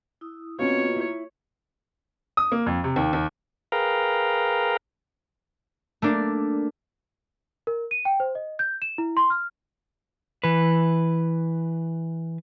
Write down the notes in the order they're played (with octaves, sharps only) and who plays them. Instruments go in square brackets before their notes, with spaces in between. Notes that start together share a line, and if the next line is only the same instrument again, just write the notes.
[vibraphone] E4 D#6
[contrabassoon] B2 [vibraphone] A#3 F4 [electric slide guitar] C4 C#4 F5 [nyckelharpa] C#5
[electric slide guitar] E4
[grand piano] D#6
A#3
F2
C3
D#2
D#2
[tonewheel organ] G#4 A#4 B4 F5 G5 A#5
[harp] A3 A#3 D4
[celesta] A#4
D#7
G5
C5
D#5
G6
E7
E4
C6
F6
[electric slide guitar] E3 B4